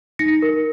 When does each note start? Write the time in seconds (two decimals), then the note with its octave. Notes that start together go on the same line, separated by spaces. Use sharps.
0.19 D#4 A#6 C#7
0.42 A#4